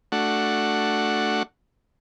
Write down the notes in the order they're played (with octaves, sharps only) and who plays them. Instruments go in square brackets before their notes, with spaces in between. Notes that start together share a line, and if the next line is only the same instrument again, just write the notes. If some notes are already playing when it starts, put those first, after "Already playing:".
[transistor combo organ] A3 D4 F#4 F#5